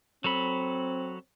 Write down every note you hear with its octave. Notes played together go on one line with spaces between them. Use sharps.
F#3 C4 A4 B5